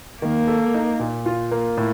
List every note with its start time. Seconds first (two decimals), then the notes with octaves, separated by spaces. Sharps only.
0.22 D#3 A#3
0.48 A4
0.74 D#4
0.99 A#2
1.26 F4
1.51 A#3
1.78 A2